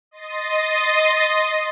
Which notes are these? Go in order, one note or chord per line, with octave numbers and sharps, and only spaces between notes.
D#5 C6 A6 A#6 D#7